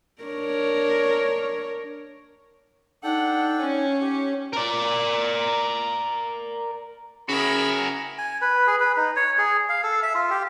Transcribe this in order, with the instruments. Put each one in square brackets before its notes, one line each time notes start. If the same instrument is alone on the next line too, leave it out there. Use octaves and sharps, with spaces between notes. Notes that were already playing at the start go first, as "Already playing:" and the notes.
[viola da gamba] D4 A#4 C#5
[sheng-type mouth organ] D4 A4 G5 [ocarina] D#4 [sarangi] F#5
[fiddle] C#4 C#5 [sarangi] G#5
[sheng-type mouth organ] G4
[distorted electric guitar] A#4 D5
[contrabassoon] C#3 [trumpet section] B3 F#5 B5 [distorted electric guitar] F#4 G#4 [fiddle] A#4 E5
[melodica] G#5
B4
G#4
B4
D#4
C#5
G#4
F5
A4
E5
F4
G4